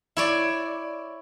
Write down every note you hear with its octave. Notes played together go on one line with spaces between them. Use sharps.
E4 C#5 D5